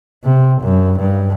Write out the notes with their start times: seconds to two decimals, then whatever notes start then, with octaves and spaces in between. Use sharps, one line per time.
0.24 C3
0.62 F#2
0.99 G2